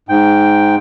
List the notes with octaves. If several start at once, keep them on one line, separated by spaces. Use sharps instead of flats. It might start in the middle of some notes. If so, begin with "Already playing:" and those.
G#2 G5